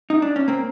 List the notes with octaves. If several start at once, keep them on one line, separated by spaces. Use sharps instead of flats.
D#4
D4
C#4
A#3 C4